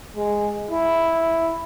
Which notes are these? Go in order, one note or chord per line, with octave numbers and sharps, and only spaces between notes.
G#3
E4